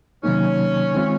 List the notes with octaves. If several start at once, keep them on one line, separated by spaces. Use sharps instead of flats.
C3 D#3 F#3 A#3 C#4 D#4
D#3 G#3 C4 F4